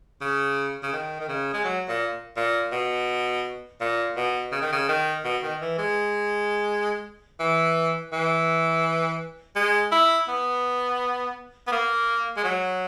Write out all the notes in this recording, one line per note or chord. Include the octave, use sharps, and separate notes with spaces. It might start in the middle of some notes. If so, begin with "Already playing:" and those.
C#3
C#3
D#3
D#3
C#3
G#3
F#3
A#2
A#2
B2
A#2
B2
C#3
D#3
C#3
D#3
B2
D#3
E3
G#3
E3
E3
G#3
E4
B3
B3
A#3
G#3
F#3